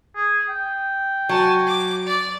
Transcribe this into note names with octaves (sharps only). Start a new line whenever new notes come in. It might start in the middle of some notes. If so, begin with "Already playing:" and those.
G#4
G5
F#3 G#5 A5
D6
D5